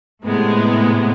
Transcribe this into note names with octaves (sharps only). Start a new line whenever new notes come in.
A2 C3 G#3 B3